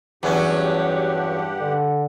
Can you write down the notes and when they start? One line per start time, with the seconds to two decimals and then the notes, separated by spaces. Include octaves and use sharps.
0.23 E2 G2 F#3 C#4 G4 F#5
1.60 D3